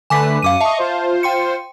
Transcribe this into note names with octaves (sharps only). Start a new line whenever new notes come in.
D3 A3 B4 G#5 D6 B6
F#2 F5 D6 D#7
D#5 E5 A5 C#6
F4 C5
G5 C6 C#7